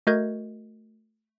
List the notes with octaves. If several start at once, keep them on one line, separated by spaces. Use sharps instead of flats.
A3 F#4 A#4 D#5 G6 G#6